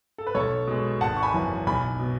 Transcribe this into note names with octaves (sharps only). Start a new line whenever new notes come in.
A4
B4
B1 A4 C#5
B2 G#3
G#1 F#5 A5
C#6
G#5 B5
F#2 E3
B1 G#5 B5
B2